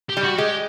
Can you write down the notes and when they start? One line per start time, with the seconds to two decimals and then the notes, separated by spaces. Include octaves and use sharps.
0.09 G4
0.17 G3
0.23 F#4
0.38 G#3 G4